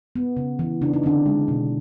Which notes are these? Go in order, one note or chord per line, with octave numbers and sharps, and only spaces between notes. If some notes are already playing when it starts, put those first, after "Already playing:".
B3
C#3
E3
C#3 D4
D#4
D3 C4 D4
G#3
B2